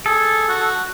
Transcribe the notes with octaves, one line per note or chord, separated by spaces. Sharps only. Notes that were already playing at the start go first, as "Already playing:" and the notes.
G#4 A4
F#4